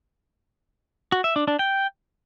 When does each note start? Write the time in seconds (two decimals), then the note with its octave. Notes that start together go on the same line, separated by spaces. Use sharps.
1.12 F#4
1.24 E5
1.36 D4
1.48 D4
1.59 G5